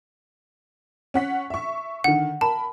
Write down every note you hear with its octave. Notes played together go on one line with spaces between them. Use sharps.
C#4 F#5 B6
E5 C#6
D3 D#3 F#5
A#4 A5 B5